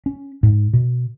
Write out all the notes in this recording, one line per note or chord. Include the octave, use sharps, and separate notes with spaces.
C#4
G#2
B2